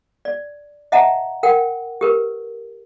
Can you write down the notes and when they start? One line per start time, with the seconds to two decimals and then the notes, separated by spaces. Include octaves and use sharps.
0.25 D5
0.92 D#5 E5 F#5 A5 A#5
1.43 A#4 F#5 G5
2.01 G4 A#4 B4